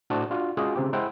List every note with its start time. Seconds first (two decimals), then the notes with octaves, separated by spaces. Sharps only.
0.10 A2 D4 F#4 C5 A5
0.31 D4 F4 F#4
0.57 G#3 C#4 F4 F#4 G#4
0.76 C#3 C4 G4
0.93 G#3 E4 C5 F#5 G5